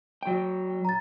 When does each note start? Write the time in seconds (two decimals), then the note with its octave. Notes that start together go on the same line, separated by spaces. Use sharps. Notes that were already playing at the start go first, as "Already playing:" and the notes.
0.23 F#3 G5
0.85 A#5 A6